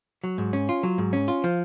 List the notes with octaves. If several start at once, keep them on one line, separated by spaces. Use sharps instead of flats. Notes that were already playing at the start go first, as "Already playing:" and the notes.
F#3
G#2
C#4
F4
F#3
G#2
C#4
F4
F3